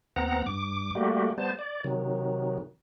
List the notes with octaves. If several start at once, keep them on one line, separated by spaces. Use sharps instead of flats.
D#2 B3 C4 F#5 A#5
G2 D6
G3 A3 A#3 F#4 G4
G3 B3 C5 A5
D5
C3 D#3 F#3